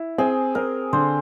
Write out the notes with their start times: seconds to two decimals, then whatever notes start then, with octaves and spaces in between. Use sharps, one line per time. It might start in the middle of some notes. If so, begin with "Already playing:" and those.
Already playing: E4
0.18 C4 G#4
0.55 C4 A#4
0.93 D3 C5